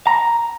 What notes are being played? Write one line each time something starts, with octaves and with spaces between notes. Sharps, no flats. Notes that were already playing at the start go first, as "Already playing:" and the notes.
A#5